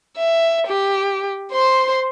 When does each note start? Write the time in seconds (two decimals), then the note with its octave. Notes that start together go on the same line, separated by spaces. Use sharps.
0.18 E5
0.67 G4
1.52 C5 C6